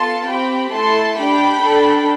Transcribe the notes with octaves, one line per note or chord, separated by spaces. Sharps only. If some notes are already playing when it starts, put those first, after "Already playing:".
Already playing: B3 F4 A4 A5 C6
C4 G4 G5 B5
A3 E4 A4 A5 C6
D4 G4 G5 B5
D4 A4